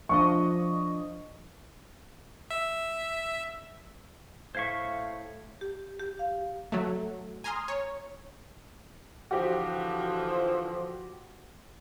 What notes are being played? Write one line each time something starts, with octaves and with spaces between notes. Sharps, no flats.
F3 D4 D#5 C#6
E5
A2 C5 F5 C#6 G#6 B6
G4
G4
F5
F#3 A3
G#5 A#5 C6 D#6 F6
C#5
D3 E3 F3 F#4 G4